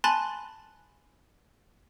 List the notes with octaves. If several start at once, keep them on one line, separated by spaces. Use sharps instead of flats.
G#5 A5 B5 C6 F#6 A6